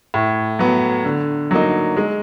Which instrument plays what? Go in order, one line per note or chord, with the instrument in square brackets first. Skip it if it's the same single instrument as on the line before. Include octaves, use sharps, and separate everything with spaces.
[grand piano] A2
F#3 B3
D3
F#3 A#3 D#4
G#3